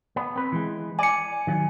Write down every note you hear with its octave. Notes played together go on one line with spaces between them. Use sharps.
B3
C4 B4
E3 G#3
D5 G#5 C#7
D#3 F#3